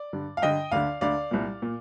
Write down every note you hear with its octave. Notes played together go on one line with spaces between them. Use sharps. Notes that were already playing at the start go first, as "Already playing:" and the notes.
Already playing: D5
G2 D3
F5
G2 D3 D#5 G5
D2 D3 D5 F5
D2 D3 D5 F5
C2 A#2
A#2